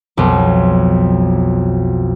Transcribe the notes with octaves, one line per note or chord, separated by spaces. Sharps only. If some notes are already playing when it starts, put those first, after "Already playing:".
B1 F2